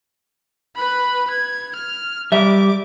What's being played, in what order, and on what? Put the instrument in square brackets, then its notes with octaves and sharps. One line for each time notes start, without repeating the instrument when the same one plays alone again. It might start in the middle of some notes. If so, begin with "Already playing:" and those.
[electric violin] B4 B5
G#6
F6
[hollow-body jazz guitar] G3 E5 [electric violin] D6